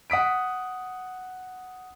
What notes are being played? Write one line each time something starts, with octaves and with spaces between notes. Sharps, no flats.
F#5 D#6 B6 D7